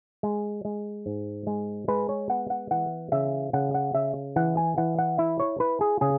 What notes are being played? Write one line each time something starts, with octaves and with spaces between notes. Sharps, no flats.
G#3
G#3
G#2
G#3
G#3 B4
C#5
B3 F#5
F#5
E3 F#5
C#3 E5
C#3 F#5
F#5
C#3 E5
E3 F#5
G#5
E3 F#5
F#5
E4 E5
C#5
E4 B4
G#4
C#3 G#4